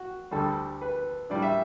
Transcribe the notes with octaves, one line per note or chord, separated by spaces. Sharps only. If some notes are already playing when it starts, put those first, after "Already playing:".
Already playing: F#4
D2 D3 G3 A4
B4
A2 G3 D4 D5
E5